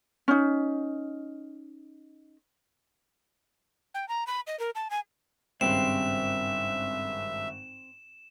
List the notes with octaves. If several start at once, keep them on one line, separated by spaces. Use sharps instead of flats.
C#4 D#4
G5
A#5
B5
D#5
A#4
A5
G#5
G#1 G2 C#3 C4 E5 E7